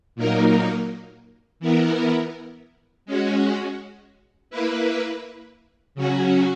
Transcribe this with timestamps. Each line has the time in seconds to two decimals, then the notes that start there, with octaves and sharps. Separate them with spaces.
0.15 A#2 F#3 A#3 D#4 A#4
1.60 E3 B3 E4 A#4
3.06 G#3 C#4 F#4
4.50 A#3 E4 B4
5.95 C#3 F#3 C#4 F#4